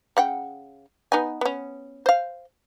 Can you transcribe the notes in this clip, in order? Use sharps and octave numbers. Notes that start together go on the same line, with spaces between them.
C#3 F#5 G5
B3 D#4 G#5
B3 C#4
C5 F5